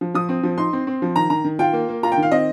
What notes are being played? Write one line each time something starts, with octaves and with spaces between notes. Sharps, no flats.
F3
F3 D#6
C4
F3
D#4 C6
C4
C4
F3
D#3 A#5
D#3 A#5
D#3
F4 G5
A#3
A#3
F4 A#5
G5
D#3
F5
C4 D#5